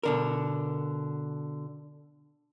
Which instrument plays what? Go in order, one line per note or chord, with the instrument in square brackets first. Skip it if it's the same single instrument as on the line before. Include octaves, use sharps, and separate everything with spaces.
[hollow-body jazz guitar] B2 D3 A#4